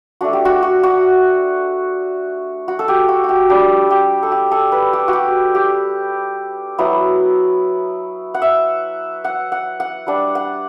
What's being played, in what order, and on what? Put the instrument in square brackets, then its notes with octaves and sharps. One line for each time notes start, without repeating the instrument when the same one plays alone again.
[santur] A3 D4 F#4
G4
F#4
F#4
F#4
F#4
A4
G4
F#4
F#4 G4
G3 D4 G4
G4
A4
G4
A4
B4
G4
F#4
G4
G4
F#3 B3 E4
F#5
E5
F#5
F#5
F#5
G3 D4 F#5
F#5